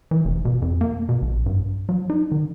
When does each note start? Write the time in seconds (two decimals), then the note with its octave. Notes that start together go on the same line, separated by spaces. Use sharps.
0.11 E3
0.25 F1
0.45 B2
0.62 F2
0.81 A#3
1.09 B2
1.22 A#1
1.46 G2
1.89 F#3
2.10 D#4
2.32 D#3